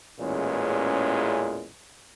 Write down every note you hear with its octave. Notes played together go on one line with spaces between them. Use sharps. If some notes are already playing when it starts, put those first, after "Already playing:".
A1 E2 A#2 G#3 C#4